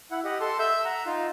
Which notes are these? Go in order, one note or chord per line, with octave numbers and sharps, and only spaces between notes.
E4 F#5
G4 D#5 F#5
A4 A5 C6
E5 E6 G6
F#5 A#5
D#4 F4 F5